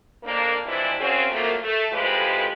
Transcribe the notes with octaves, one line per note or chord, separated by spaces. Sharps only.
F2 A#3 D4
G#2 C3 E3 F3 D4 E4
F#2 C#3 C4 C#4 F#4 G#4
F3 F#3 A3 A#3
A3
F2 A2 F3 G#3 G4 B4